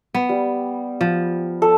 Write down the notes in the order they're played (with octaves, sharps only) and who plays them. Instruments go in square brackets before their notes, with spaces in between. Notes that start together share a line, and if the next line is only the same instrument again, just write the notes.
[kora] B3
[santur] G3
[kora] F3
[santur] A4